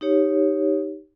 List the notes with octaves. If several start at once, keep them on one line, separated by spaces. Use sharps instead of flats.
D#4 G4 C#5